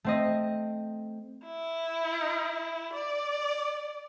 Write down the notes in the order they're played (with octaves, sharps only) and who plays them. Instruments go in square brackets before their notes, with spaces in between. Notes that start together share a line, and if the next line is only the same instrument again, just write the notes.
[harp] A3 C4 D#5
[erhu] E4
D5